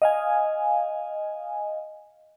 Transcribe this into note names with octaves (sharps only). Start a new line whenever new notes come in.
D#5 F5 G#5